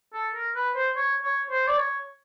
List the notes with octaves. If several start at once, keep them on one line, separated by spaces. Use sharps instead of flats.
A4
A#4
B4
C5
C#5
C#5
C5
D5
C#5